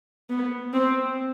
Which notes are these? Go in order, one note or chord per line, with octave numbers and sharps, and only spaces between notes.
B3
C4